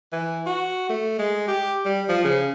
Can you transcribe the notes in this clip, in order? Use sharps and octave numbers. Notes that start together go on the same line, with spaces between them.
E3
F#4
A3
G#3
G4
G3
F3
C#3